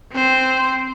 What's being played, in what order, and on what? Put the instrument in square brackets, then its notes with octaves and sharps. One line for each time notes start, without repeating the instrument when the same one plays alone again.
[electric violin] C4 C5